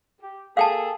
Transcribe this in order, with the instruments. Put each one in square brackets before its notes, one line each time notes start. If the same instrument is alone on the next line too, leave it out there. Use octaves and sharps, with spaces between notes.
[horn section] G4
[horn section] A#3 G#4 A4 [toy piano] F5 G5 A5